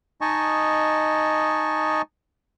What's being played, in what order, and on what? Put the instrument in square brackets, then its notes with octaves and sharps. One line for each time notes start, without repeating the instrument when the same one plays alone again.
[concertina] D#4 D#5 G#5 A5 C#6